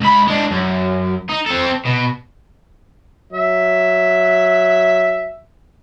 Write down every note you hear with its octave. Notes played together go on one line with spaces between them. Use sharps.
C#2 B5
G#3 D4
F#2
D#4
C4 A4
B2
F#3 E5